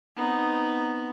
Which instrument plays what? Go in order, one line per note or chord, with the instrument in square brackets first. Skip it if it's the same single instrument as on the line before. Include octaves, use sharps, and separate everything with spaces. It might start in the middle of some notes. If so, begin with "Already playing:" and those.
[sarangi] B3 [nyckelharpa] C4 D#4